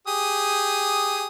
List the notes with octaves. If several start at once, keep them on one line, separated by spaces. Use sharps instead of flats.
G4 G#4 D#6